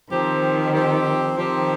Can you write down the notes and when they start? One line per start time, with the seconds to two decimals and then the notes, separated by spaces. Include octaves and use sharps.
0.10 D#3 F3 C4 G4 C5
0.74 F3 C4 G4 C5
1.37 D#3 F3 C4 G4 C5